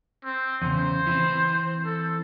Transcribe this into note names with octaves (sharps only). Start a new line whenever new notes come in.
C4
E2 C#3 C5
E3 C4
A4